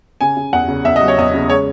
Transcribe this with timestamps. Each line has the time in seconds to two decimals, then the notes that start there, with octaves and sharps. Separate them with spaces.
0.21 C#3 G#5
0.37 C#3
0.53 E2 F#5
0.69 C#3
0.85 E2 E5
0.96 F#3 D#5
1.08 C#5
1.18 E2 D#5
1.34 C#3
1.50 G#3 C#5